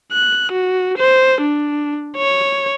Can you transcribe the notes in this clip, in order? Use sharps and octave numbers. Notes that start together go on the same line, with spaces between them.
F#6
F#4
C5
D4
C#5